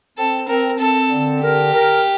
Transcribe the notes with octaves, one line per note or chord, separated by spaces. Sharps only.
C4 A4
C4 A#4
C4 A4
D3
G4 A#4
A#4